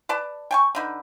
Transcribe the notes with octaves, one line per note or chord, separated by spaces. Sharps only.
B4 D5 A5
G5 G#5 C#6
D3 D#4 B4